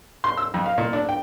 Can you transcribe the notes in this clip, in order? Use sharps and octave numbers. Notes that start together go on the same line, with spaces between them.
C6
E6
F2
F5
A#2
D4
G5